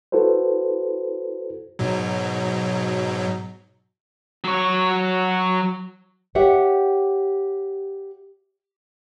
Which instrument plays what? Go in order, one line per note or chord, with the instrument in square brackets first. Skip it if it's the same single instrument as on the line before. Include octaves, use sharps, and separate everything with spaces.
[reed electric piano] E4 F#4 A4 B4 C5
[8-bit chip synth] G#2 B2 F#3
[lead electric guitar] F#3 C#5
[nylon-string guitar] G4 C#5 E5 F#5 G5